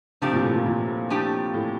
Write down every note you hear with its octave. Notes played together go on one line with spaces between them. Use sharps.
C3 F3 A3 D4 G4
A#2
A2
A#2
A#2
F3 A3 D4 G4
A2